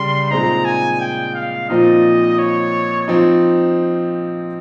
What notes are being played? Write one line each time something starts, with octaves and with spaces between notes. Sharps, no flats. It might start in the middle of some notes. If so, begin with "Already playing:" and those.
Already playing: C#3 G3 C6
A#2 G#3 C4 D#4 A#5
G#5
G5
F5
A#2 F3 C4 D#4 D#5
C#5
F3 C4 D#4